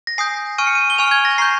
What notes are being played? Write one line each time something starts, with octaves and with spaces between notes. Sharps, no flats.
A#6
G#5 D#6 G6 C7
G#5 C#6 F6 D#7
C#7
D#7
G7
G#5 C#6 F6 F7
G#6
A#6
A#5 C#6 G6 C7